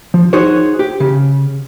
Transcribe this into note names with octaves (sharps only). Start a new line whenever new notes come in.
F3
D#4 F#4 G#4 C5 C#5
G4
C#3